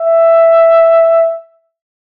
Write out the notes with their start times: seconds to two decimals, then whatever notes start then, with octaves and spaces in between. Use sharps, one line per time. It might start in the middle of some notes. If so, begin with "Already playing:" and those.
Already playing: E5